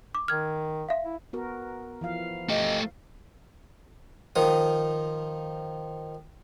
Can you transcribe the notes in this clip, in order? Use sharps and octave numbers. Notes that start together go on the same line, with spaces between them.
D6
D#3 F6 G#6
E5 F5
E4
B3 F#4 A#4
E3 F3 F5
A3 G4 D#5
D#3 F3 D#6